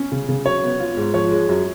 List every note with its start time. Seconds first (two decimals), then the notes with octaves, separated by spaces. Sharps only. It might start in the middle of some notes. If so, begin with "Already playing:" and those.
Already playing: C#4
0.12 C#3
0.29 C#3
0.45 F#3 C#5
0.63 B3
0.80 F4
0.97 G#2
1.14 F3 C#5
1.31 G#3
1.49 F#2